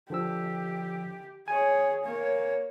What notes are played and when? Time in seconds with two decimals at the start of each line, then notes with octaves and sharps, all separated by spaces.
0.10 D3 F3 G4 E6
1.48 G#4 C#5 G#5
2.05 A#3 C#5